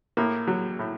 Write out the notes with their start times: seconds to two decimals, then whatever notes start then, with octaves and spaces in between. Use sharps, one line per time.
0.17 A2 A#3
0.47 F#3
0.79 A2